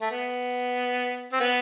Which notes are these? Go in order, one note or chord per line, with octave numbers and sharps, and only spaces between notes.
A3
B3
C4
B3